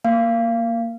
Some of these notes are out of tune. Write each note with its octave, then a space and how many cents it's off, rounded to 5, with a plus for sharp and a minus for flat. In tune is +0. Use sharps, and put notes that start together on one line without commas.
A#3 +0 F5 -25